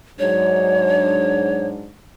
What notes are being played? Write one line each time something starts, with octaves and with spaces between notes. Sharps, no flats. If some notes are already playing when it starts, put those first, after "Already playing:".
G#2 F#3 D4 C#5